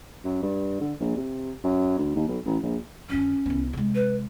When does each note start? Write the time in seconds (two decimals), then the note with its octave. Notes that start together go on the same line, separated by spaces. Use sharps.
0.24 F#2
0.42 G2
0.80 D3
1.00 A#1
1.16 C3
1.64 F#2
1.98 D2
2.15 D#2
2.28 B1
2.45 A1
2.63 A#1
3.10 F2 D3 C#4
3.46 C2 B3
3.73 C3 G#3
3.95 B4